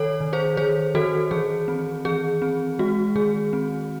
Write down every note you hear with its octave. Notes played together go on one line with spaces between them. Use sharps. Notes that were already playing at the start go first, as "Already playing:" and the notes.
Already playing: D#3 A4 C#5
D#3
G#4 C5
D#3 G#4 C5
D#3 F#4 A4
E3 G#4
C4
E3 G#4
C4
G#3 F#4
D#3 G#4
C4